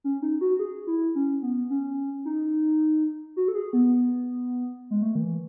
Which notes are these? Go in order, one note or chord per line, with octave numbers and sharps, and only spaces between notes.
C#4
D#4
F#4
G#4
E4
C#4
B3
C#4
D#4
F#4
A4
G#4
B3
G#3
A3
D#3
E3